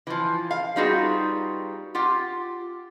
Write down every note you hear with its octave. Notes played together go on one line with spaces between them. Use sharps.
E3 F3
F5
G3 B3 D#4 F4 F#4 G#4
F4 G4 F#5